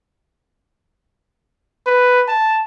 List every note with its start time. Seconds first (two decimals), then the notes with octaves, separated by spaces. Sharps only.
1.87 B4
2.28 A5